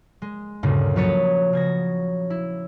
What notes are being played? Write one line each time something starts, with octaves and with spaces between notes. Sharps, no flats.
G#3
D2 G2 A#2 C#3
F3 F#3 B4 C#5 D#6 A6
C#3 G#6 A#6
E4